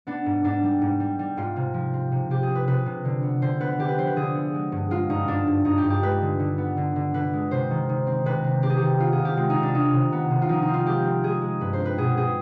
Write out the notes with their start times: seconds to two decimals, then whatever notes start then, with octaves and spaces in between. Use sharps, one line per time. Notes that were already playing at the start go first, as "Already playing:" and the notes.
0.07 B3 D4
0.26 G#2
0.44 G#2 D4
0.63 G3
0.82 G#2
1.00 G3
1.19 G3
1.37 G#2 F4
1.56 C3
1.74 F3
1.93 C4
2.12 C3
2.30 C3 G4
2.43 G#4
2.49 C4
2.55 B4
2.67 C3 B4
2.86 C3
3.05 D3
3.23 B3
3.42 D3 C5
3.60 B3 B4
3.79 D3 G4
3.88 B4
3.98 F3 C5
4.07 B4
4.16 D3 G#4
4.35 B3
4.54 G#3
4.72 G2
4.90 G#3 F4
5.09 G2 D#4
5.28 G2 D4
5.47 G2
5.65 G2 D#4
5.77 G4
5.84 G2
5.90 G4
6.02 G#3 B4
6.21 D3
6.39 D3
6.58 B3
6.77 D3
6.96 D3
7.14 D3 B4
7.33 G#3
7.51 C3 C5
7.71 D#3
7.89 D#3
8.07 C4
8.26 C3 B4
8.44 C4
8.63 C4 G4
8.70 G#4
8.77 D#3 G4
9.00 B3 F4
9.12 G#4
9.19 C3
9.25 G4
9.37 G#3 F4
9.50 D#4
9.55 C3
9.63 D4
9.75 D#3 D#4
9.93 C3
10.12 B3
10.31 C3
10.42 F4
10.49 F3 D#4
10.62 D#4
10.68 C4
10.74 F4
10.86 G#3 G4
11.05 C4
11.23 G#3 G#4
11.42 G#3
11.61 G2 B4
11.73 C5
11.80 C4
11.85 B4
11.98 B2 G#4
12.17 C4 G#4